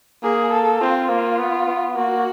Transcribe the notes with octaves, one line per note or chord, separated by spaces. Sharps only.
A#3 G#4
A4
C4 F4
A#3
B3
B3
A#3 F#4